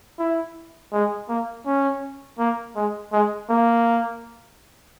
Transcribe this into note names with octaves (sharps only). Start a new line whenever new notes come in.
E4
G#3
A#3
C#4
A#3
G#3
G#3
A#3